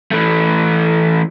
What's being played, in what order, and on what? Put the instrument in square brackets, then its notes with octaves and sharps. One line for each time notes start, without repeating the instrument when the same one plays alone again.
[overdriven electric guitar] E3 A3